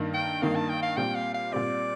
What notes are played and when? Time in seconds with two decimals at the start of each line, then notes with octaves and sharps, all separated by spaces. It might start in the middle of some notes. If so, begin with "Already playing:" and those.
Already playing: G2 D#3 A#3
0.14 G5
0.42 G2 D#3 A#3 F5
0.55 A5
0.69 G5
0.83 F5
0.97 A#2 G3 C4 G5
1.15 F5
1.34 F5
1.52 A#2 G3 C4 D5